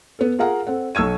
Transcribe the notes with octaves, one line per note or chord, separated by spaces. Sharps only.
B3 A4
F4 G#4 A#4 F5 F#5 A#5
C4 A4 F#5
B1 C#6 E6 G#6 D#7